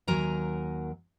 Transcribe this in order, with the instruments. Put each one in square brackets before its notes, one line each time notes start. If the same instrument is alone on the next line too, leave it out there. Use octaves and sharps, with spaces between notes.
[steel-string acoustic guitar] D#2 F#3 A#4 G#5 A#5